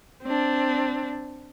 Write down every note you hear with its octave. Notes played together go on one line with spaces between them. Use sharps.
C4 D4